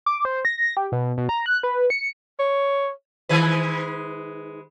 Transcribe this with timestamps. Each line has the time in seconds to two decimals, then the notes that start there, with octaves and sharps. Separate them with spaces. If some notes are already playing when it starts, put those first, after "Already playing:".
0.06 D6
0.25 C5
0.45 A#6
0.77 G4
0.92 B2
1.18 B2
1.29 A#5
1.46 F#6
1.63 B4
1.90 C#7
2.40 C#5
3.29 D#3 G#3 B4